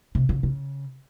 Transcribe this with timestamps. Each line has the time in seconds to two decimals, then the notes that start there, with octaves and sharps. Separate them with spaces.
0.15 C3
0.29 C#3
0.43 C#3